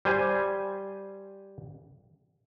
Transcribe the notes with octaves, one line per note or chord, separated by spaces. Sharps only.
G3 C5 G#5